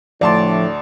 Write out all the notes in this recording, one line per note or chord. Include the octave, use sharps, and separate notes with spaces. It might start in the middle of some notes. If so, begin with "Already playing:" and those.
D2 A2 F3 A3 D4 D5 A5 C6